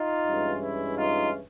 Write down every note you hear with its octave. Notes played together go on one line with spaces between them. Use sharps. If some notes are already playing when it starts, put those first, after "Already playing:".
Already playing: D#4 F4
G2 E3 G#3 C#4
E4
D#4 F4